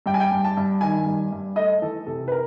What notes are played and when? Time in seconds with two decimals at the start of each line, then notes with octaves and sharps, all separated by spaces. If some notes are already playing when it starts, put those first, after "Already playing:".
0.06 G2 G5
0.14 G#5
0.20 G5
0.32 G2
0.44 A5
0.57 G2
0.81 D#3 G#5
1.06 G2
1.32 G2
1.56 A3 D#5
1.82 E3 A4
2.06 C3 A4
2.28 B4
2.32 A#4